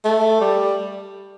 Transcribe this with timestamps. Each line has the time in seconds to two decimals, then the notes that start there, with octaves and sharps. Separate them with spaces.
0.05 A3
0.41 G3